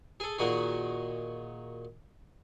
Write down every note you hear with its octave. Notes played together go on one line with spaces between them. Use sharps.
G#4 A4
A#2 D#3 F#4 G#4